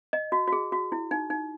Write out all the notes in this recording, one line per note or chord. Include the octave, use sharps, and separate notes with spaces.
D#5
F#4
F#4
G#4
F#4
E4
D#4
D#4